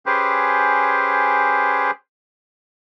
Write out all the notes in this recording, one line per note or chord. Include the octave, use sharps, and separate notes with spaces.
C#4 G4 G#4 B4 C5